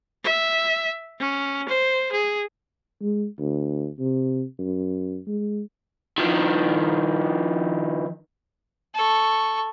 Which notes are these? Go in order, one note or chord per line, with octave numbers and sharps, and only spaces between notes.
E5
C#4
C5
G#4
G#3
D2
C3
F#2
G#3
D#3 F3
A4 C#6